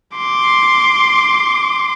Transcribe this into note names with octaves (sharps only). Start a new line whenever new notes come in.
C6 D6